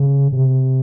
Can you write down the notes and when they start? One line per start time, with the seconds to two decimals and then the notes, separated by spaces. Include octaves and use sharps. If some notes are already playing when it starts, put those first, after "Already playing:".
Already playing: C#3
0.32 C3